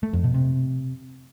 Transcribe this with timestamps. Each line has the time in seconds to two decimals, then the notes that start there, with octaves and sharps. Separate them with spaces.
0.03 A3
0.13 F2
0.24 B2
0.34 C3